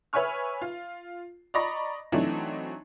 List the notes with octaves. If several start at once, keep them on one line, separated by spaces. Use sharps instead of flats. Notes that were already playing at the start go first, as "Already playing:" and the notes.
B4 C#5 E5 G#5 C#6 F6
F4
D5 D#5 A#5 B5 C#6 A#6
E3 F#3 A3 C4 D4 D#4